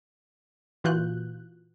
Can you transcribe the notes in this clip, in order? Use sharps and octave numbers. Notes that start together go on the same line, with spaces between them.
A#2 E3 F4 F#4 F#6 G6